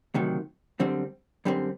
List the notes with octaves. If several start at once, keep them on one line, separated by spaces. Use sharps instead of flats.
D2 C3 D#3 F#3
F#2 D3 G3 C4
F#2 D3 G3 C4